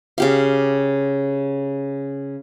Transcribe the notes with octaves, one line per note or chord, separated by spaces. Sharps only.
C#3 G4 F5